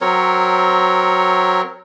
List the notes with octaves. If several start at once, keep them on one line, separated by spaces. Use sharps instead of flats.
F#3 C4 A#4 C#5